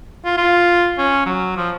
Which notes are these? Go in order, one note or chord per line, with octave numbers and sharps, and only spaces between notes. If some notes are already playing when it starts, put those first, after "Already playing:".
F4
F4
C#4
F#3
F3